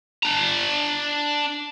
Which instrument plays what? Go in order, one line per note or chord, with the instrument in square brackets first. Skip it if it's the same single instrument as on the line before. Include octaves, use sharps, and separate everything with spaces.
[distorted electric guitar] D4 A#5